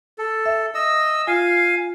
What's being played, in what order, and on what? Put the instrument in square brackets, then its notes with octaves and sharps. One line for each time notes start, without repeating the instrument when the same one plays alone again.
[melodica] A4
[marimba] E5
[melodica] D#5 E6
[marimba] F4 [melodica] F5 G#5